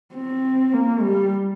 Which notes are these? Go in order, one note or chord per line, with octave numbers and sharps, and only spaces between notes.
C4
A#3
G3